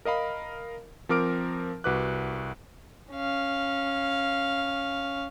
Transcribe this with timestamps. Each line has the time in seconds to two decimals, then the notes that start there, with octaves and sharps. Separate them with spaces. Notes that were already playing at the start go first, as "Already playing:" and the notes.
0.05 A#4 D#5 F5 B5
1.09 F3 C4 A#4 D6 F6 D7
1.84 C2 F#4 B4 D6 F#6
3.12 C#4 F5